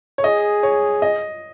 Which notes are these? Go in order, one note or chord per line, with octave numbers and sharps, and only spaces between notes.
C#5
G#4 D#5
C#5
D#5